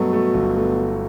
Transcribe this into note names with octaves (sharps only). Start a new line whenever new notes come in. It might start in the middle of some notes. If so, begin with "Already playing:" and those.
Already playing: G2 B2 F#3 A3
A3
G1
A3